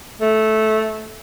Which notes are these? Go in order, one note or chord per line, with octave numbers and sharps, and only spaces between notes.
A3